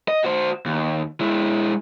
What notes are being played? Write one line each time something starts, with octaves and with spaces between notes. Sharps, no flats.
D#5
F#4 C5
D#2
G#3 E4